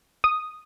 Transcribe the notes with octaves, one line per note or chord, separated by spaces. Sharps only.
D#6